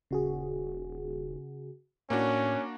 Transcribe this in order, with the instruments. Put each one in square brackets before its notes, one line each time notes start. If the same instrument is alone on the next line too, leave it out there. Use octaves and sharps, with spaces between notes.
[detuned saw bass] D#1 [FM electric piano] C#3 F#4 G#4
[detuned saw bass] A2 [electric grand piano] A#3 D4 F#4 [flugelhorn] C#4